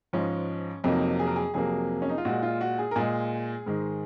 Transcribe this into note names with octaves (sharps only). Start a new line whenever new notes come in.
G#2 F3 G#3 C#4
F2 C3 F#3 A#3 D#4
G#4
A#4
G#4
F2 C3 F#3 A#3 G#4
C#4
D#4
F4
A#2 G#3 F#4
F4
F#4
G#4
A#4
A#2 G#3 G#4
G#2 D#3 G#3